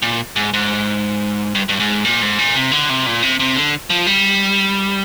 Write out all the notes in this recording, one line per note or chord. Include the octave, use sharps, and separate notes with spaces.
A#2
G#2
G#2
G2
G2
G#2
A#2
G#2
A#2
C3
D3
C3
A#2
C3
C3
D3
F3
G3